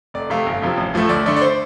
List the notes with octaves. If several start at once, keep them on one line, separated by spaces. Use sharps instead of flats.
F1 D5
F2 C3 A3 F5
G1
F2 C3 F3
A1
A2 F3 A3
D2 D5
D3 A3 D5
D5
C5